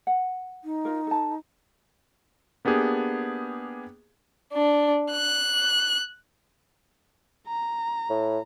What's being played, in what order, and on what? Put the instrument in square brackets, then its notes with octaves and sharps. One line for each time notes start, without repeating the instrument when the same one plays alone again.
[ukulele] F#5
[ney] D#4
[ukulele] F4 A#4
A4 A5
[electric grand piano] A#3 B3 D4 G4 G#4
[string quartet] D4
F#6
[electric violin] A#5
[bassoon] A2